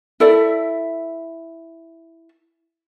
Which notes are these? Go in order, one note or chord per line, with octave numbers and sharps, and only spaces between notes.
E4 A4 D5 E5